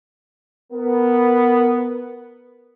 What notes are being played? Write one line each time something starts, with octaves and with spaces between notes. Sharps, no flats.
B3 A#4